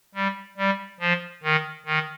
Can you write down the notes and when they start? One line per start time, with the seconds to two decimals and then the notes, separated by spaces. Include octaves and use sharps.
0.15 G3
0.57 G3
1.00 F3
1.43 D#3
1.86 D#3